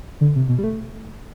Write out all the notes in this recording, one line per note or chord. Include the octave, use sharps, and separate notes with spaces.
D3
C3
B2
G3
A3